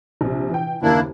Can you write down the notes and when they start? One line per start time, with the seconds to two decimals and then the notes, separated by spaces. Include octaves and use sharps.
0.21 A#1 C3
0.50 E3 G5
0.82 F#1 D#2 A#3 D4 E4